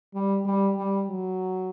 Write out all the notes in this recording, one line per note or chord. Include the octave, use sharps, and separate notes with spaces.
G3
G3
G3
F#3